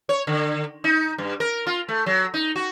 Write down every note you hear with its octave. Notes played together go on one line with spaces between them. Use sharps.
C#5
D3
D#4
G2
A#4
F4
A3
F#3
D#4
F#4